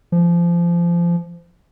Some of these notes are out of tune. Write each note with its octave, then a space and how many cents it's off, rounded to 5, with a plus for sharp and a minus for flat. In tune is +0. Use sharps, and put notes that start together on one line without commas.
F3 -25